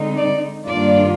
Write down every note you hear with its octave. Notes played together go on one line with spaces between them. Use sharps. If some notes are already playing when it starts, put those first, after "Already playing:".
Already playing: D3 G#3 C4 D#4
D5
G2 D#3 A#3 D4 F4 D5